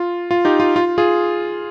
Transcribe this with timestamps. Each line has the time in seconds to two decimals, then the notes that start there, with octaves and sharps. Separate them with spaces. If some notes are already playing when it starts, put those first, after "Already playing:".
Already playing: F4
0.31 F4
0.45 D#4 G4
0.60 F4
0.76 F4
0.98 F4 G#4